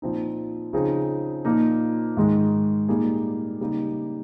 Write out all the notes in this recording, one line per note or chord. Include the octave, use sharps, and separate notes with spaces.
A#2 F3 C4 D#4
C#3 F3 C4 D#4 G#4
A#2 F3 A#3 D#4
G#2 D#3 G#3 D#4
A#2 G3 A#3 D#4 G#4
C#3 G3 A#3 D#4